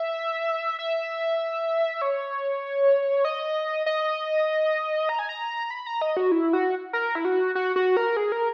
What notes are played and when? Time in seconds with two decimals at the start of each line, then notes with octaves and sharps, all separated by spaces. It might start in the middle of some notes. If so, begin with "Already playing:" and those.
Already playing: E5
0.79 E5
2.02 C#5
3.25 D#5
3.86 D#5
5.09 A#5
5.19 G#5
5.29 A#5
5.70 B5
5.86 A#5
6.01 D#5
6.17 F#4
6.32 E4
6.53 F#4
6.93 A#4
7.15 E4
7.25 F#4
7.55 F#4
7.76 F#4
7.97 A#4
8.17 G#4
8.32 A#4